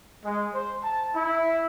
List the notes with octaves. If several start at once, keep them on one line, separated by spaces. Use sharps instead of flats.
G#3
C5
A5
E4